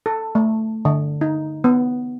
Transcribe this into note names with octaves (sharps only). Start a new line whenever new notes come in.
A4
A3
D3
D#4
B3